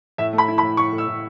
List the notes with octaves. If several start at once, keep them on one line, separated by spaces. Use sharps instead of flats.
A2 E5
A3
B5
E4
B5
A2
A2 C#6
A2
E6
A2